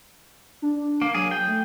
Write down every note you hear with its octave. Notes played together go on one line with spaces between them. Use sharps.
D4
A#3
F#3 G#4
G5
A3